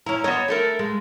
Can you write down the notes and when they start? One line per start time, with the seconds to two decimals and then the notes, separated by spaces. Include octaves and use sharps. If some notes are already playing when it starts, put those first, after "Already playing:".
0.06 C#4 E4 A#5
0.24 B3 C4 C#5 D#5
0.48 A3 A4 A#4
0.79 G#3